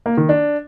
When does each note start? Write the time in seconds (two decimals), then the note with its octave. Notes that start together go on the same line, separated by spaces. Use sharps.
0.06 A#3
0.17 D#3
0.29 D4